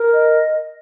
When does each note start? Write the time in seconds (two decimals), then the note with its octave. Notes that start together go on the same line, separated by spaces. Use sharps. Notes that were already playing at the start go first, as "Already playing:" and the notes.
Already playing: A#4
0.12 D#5